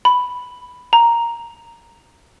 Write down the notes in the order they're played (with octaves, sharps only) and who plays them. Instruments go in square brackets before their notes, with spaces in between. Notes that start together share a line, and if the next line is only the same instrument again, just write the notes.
[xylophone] B5
A#5